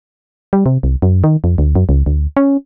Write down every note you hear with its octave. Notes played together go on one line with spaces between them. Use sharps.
G3
C3
C2
F#2
D#3
F2
D2
F#2
C#2
D2
C#4